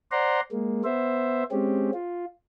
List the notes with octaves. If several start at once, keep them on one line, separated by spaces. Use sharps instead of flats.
C5 D5 F#5 A#5 C6
G#3 A#3
B3 C5 E5
G#3 C4 C#4 G4
F4